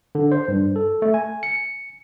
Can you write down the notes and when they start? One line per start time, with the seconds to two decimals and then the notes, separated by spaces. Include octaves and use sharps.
0.15 D3
0.32 C5
0.48 G2
0.76 A4
1.02 A3
1.14 G#5
1.43 C#7